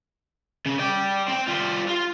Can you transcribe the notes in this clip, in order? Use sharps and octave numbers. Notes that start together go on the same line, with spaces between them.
C#3
D5 G5
C4 G5
G3 F4
F4